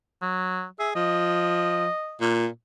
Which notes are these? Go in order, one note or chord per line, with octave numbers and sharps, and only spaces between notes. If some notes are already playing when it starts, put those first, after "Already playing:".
F#3
G#4 E5
F3 D#5
A#2